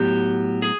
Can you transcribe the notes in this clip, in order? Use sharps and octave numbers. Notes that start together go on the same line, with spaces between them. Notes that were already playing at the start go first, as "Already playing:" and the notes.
Already playing: A2 F#3 B3 G4
G#4